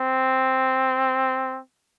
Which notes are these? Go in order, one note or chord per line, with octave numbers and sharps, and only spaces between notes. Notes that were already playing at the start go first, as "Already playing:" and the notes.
Already playing: C4